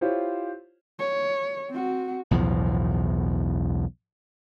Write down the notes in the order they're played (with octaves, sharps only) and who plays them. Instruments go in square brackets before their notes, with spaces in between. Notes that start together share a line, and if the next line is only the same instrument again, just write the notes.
[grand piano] E4 F4 G4 C5 C#5
[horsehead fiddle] C#5
C4 F#4
[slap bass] B1 E2 A2 F3